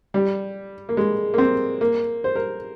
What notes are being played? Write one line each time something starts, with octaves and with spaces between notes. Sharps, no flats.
G3
A#3
G#3
A#3
C4
A#3
C5
A#4